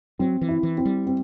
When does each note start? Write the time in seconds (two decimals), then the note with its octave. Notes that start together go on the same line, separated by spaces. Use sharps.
0.19 F#3 C4
0.41 E3
0.49 E4
0.63 E3
0.78 C4
0.85 G3
1.07 C4